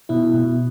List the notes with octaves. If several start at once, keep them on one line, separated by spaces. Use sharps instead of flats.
B2 E4
B2